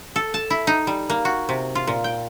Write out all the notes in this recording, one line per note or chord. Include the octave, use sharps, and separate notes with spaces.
A4
A5
E4
D#4
G3
A#3
F#4
C3
F4
A#2
G5